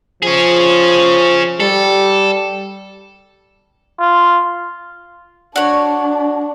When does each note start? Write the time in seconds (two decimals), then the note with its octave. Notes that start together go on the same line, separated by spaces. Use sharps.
0.22 F3 C#4 G#4
1.60 G3 A4
4.00 F4
5.56 D4 F#4 C#5 D5